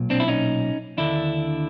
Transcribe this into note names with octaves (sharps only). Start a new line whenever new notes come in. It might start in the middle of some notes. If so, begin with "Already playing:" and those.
Already playing: B1 A#2
C4 D4
E4
C#4 D#4
D#2 D3 D4 E4